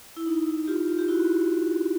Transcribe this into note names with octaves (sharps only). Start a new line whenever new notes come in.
E4
D#4
F4 G4
G4
E4 F#4